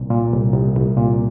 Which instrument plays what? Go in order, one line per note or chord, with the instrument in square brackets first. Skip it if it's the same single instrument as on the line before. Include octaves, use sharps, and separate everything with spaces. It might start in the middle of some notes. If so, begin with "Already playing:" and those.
Already playing: [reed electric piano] C2 A#2
A#2
C2
C2
C2
A#2